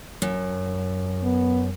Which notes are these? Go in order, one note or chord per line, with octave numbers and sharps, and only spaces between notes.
F#2
B3